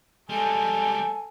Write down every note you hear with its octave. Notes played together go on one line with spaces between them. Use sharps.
G3 G#3 A4 G#5